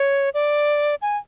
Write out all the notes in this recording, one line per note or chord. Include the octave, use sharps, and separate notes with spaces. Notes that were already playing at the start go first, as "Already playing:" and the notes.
Already playing: C#5
D5
G#5